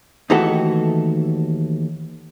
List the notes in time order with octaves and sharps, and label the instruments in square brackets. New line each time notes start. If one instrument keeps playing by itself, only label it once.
[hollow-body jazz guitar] D#2 D#3 E3 A3 F#4 A4